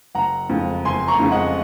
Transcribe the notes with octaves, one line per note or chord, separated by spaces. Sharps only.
F#1 F#5 A#5
F2 C#3 G#3
F#1 G#5 C6
A#5 C#6
F2 C#3 G#3
D#5 F#5